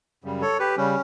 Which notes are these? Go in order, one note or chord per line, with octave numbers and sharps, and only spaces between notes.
F#2 C#3 G3
A4 C#5
G4 B4
C#3 G3 C#4